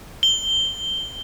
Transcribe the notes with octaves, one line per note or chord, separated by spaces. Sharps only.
G7